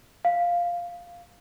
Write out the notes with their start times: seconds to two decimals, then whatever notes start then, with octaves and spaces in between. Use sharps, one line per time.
0.25 F5